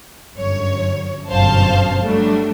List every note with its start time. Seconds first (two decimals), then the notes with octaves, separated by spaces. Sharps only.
0.35 G1 F#2 C#5
1.29 G1 F#2 B2 C5 F5 A5
2.02 F#3 G3 A3 D4